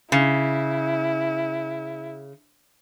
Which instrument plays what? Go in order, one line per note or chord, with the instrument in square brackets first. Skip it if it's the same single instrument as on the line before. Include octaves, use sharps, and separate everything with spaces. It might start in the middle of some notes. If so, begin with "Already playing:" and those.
[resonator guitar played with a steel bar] C#3 [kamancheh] E4